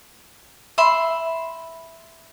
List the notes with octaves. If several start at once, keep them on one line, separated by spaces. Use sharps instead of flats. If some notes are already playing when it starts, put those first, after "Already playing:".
E5 B5 C6